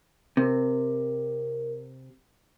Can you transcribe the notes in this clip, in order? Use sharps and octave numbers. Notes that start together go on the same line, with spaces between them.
C3 A#4